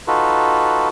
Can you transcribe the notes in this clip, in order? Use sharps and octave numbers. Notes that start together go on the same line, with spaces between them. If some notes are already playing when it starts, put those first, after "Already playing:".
D#4 F4 F#4 A4 B4